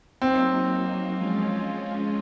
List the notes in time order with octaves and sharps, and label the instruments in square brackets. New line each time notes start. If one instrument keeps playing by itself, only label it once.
[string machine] F#3 A#3 D#4 [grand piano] C4
[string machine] F3 G#3 C#4 F4